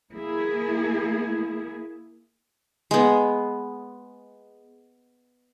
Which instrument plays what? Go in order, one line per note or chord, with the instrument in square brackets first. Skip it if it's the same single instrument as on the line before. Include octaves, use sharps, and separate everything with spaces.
[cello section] A#3 E4 G#4
[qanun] G#3 B3